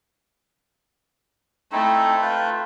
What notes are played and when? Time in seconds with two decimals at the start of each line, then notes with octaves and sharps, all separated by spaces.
1.72 A3 C4 D#4 E4
2.22 F4 B4 G5